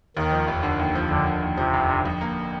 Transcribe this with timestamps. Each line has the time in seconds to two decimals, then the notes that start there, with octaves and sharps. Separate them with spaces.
0.17 D#2 D#3
0.32 F3
0.48 F1
0.63 D3
0.79 D#2
0.95 F3
1.10 F1 D3
1.26 D3
1.42 D#2
1.58 C3 F3
1.73 F1
1.89 D3
2.05 F2
2.21 A#3